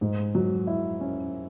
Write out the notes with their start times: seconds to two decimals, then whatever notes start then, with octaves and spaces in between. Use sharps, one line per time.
0.01 G#2
0.35 F#3
0.67 E4
1.01 C#4